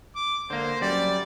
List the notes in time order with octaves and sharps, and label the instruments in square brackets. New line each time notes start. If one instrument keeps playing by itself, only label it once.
[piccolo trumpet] D6
[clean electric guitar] D3 A#3 [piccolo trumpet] C5
[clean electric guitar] F#2 G3 [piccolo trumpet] D5